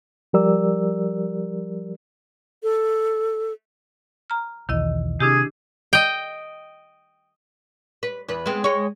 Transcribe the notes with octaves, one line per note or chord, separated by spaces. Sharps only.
F3 G3 G4 A#4 D5 E6
A4
A#5 F6
B1 E2 D#3 E4 D#5
C3 D4 E4 G4 G#4
D#5 G5
B4
E2 B4
G#3 B3 C4
G#3 C#5